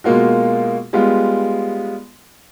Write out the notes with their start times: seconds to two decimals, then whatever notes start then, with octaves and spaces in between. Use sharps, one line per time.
0.04 B2 G#3 A#3 F4 F#4
0.93 G3 G#3 B3 F4